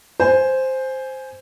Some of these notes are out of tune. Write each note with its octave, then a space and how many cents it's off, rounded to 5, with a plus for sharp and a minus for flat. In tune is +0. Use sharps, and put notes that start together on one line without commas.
C5 +0 G#5 +5